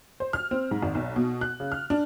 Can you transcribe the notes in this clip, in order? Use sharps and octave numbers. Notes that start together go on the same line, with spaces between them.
C5
F6
C4
G#2
G#1
B1
B2
F#6
C#3
F6
D4